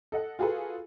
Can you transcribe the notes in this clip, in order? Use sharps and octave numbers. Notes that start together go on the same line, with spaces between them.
A4 D#5 F#5
F4 F#4 G#4 A4 B4